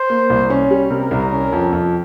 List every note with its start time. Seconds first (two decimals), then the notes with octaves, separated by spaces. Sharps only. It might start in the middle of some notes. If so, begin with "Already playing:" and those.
Already playing: C5
0.10 A#3
0.30 C2
0.50 C#4
0.71 G3
0.91 C3 A#4
1.11 C2
1.32 C#4
1.52 F2
1.72 F2